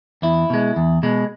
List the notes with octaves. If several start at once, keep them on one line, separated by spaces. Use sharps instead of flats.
E2 E4
B2 G#3
E2
B2 G#3